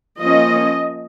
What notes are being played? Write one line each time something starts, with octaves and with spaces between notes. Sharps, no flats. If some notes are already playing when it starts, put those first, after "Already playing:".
F3 A#3 C#4 D#5